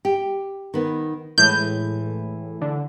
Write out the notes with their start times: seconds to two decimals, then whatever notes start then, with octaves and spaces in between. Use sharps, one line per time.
0.05 G4
0.74 D#3 B3
1.38 A2 E3 G#3 G6
2.61 D3